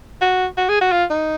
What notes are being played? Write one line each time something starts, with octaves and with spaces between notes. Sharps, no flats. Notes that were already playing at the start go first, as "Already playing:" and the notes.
F#4
F#4
G#4
F#4
F4
D#4